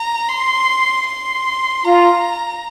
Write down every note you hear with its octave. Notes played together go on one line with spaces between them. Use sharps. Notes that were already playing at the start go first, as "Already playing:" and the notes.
Already playing: A#5
C6
C6
F4 A#5